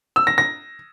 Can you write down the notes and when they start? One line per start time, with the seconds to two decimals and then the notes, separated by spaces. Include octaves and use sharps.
0.16 E6
0.27 A#6
0.38 A#6